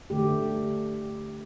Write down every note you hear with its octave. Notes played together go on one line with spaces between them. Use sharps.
D3 A3 G4